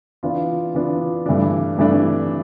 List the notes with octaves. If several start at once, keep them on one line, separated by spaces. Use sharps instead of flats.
E3 B3 D4 F4
E3 B3 D4 F4
G2 E3 A3 D4
G2 E3 A3 D4